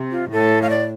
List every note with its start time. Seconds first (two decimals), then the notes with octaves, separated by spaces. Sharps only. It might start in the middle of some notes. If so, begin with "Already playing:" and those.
Already playing: C3
0.11 F4
0.31 A2 A4
0.62 F5
0.70 D5